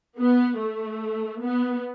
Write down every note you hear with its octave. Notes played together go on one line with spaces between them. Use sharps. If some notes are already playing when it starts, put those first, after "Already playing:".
B3
A3
B3